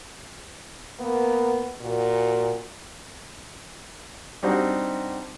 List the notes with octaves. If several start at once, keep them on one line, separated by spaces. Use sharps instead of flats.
A#3 B3
A#2 F#4
G3 C4 D4 D#4 F#4 G4